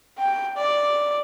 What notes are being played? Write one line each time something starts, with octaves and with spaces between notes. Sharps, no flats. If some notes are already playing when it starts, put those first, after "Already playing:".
G5
D5